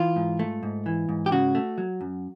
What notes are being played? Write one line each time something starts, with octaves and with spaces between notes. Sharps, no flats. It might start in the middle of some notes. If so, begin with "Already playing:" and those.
Already playing: E3 F4
G#2
A3
G#2
E3
G#2
G4
C#3 F#4
A3
F#3
F#2